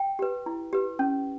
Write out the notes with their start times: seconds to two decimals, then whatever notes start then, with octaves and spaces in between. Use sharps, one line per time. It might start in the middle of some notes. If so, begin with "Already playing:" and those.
Already playing: G5
0.19 G4 B4
0.46 E4
0.73 G4 B4
0.99 C#4